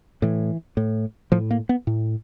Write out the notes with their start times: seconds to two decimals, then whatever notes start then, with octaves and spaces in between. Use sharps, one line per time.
0.22 A2 E3
0.77 A2
1.32 A2 F3
1.51 A#3
1.69 B3
1.87 A2